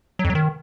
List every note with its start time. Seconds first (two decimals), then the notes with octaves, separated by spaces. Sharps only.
0.19 F#3
0.25 F2
0.30 F#3
0.35 D#3